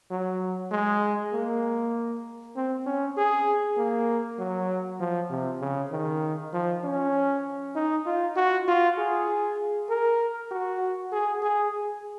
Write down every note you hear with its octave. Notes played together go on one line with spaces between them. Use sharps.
F#3
G#3
A#3
C4
C#4
G#4
A#3
F#3
F3
C3
C#3
D#3
F3
C#4
D#4
F4
F#4
F4
G#4
A#4
F#4
G#4
G#4